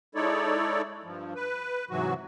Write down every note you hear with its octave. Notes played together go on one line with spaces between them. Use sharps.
G#3 D#4 E4 A4 C#5 D5
G2 F3
B4
G#2 C3 E3 F#3 F#4